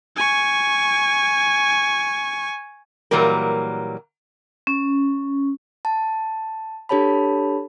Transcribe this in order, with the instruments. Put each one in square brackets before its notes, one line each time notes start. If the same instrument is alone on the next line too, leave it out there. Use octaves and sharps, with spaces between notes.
[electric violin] G#5 C#6
[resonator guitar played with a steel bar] A#2 E3 F#3 G3 A#3 A#4
[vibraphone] C#4
[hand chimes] A5
D4 G4 A4 C#5 A5 B5